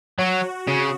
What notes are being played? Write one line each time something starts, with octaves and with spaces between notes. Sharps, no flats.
F#3 F#4
C#3